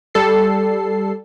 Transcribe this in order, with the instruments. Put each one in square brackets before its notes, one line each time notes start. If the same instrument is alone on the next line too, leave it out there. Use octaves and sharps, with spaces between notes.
[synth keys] G3 A4 C7